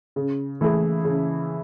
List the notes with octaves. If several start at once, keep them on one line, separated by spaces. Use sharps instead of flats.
C#3
E3 A3 E4 G#4
C#3